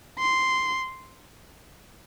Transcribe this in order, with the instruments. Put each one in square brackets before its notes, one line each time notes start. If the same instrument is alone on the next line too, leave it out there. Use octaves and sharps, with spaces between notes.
[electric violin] C6